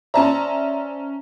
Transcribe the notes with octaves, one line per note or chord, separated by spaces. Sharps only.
C#4 C5 D5 E5 A5 A#5